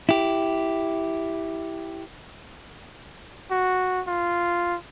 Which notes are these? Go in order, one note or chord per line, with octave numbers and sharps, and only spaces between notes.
E4 G4
F#4
F4